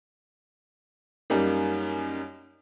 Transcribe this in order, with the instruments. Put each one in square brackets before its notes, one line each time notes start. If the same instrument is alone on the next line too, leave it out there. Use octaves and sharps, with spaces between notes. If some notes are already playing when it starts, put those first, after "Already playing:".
[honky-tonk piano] F#2 G3 A#3 D#4